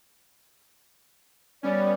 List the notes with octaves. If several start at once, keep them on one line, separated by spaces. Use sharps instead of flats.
G3 B3 C#4 D5